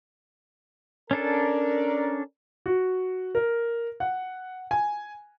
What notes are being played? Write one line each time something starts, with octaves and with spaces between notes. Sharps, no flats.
C#4 D4 A4 A#4 D5
F#4
A#4
F#5
G#5